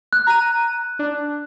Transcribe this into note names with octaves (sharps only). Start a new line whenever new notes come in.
F#6
A#5 D#7
D4